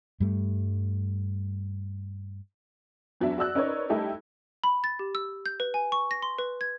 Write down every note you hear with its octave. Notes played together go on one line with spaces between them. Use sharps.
G2 G3 A3
E2 F#3 D4 E5
F#4 D5 E6 F#6
C#4 D#4 A#4 B4 C#5 D5
G3 A3 D#4 E4 G4 A4
B5
A6
G4
E6
G6
B4
G#5
C#6
A#6
C6
B4
G#6